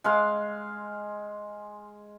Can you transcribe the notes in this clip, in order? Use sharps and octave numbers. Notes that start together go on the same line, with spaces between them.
G#3 F5 C6